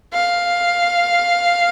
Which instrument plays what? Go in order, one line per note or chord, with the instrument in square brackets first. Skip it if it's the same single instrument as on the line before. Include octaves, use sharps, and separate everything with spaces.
[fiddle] F5